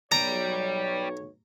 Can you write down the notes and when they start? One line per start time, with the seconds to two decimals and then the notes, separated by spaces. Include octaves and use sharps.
0.12 B1 C#5 D5 G5 A#5